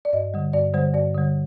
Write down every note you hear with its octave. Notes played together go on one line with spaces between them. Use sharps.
D5
G2 D#5
D3 G3
G2 D5
D3 G3 C5
G2 D5
D3 G3